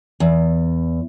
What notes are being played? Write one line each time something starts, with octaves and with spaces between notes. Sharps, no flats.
E2